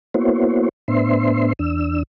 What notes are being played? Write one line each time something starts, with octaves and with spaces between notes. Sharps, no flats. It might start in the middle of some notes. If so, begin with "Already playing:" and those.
A#3 B3 E4 F#4 C5 C#5
A2 B3 D4 C5 E5 C6
E2 D4 E6